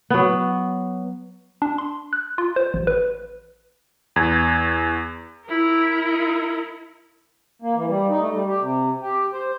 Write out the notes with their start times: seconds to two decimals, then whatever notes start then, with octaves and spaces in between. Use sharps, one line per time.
0.10 F#3 B3
1.62 D4
1.78 C6
2.13 F#6
2.38 F4
2.56 C5
2.74 A1
2.87 B4
4.16 E2 G#6
5.46 E4 A#4
7.62 A#3
7.75 E3
7.88 G3
8.09 D#4
8.20 A3
8.33 G3
8.47 G4
8.61 C3
9.01 G4
9.33 C5